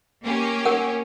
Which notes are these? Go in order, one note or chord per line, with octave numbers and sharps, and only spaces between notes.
A#3 C#4 G4
A#4 F#5